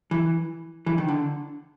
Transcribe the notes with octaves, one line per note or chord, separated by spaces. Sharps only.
E3
E3
D#3
D3